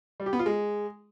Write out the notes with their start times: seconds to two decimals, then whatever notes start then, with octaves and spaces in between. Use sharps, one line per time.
0.20 G3
0.26 G4
0.33 B3
0.39 F4
0.46 G#3